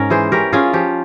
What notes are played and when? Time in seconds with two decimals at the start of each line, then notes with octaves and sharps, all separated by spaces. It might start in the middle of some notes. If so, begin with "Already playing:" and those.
Already playing: G#2 C#4 A#4
0.10 E3 G#4 C5
0.32 C#4 G4 A#4
0.53 C#4 F4 G#4
0.73 F3 G4